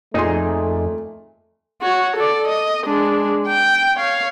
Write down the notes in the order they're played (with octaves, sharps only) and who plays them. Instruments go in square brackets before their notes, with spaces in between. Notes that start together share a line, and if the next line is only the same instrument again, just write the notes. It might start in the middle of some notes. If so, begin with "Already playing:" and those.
[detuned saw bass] F2 [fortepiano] A#2 C6 [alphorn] A3 [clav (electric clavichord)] D#4 G#4
[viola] F#4 C#5
A4 D5
D#5
G#3 D4
G5
C#5 F5